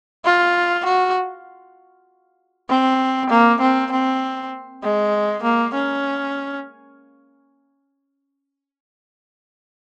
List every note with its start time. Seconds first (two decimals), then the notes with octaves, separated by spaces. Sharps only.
0.25 F4
0.85 F#4
2.69 C4
3.30 A#3
3.61 C4
3.91 C4
4.83 G#3
5.43 A#3
5.74 C#4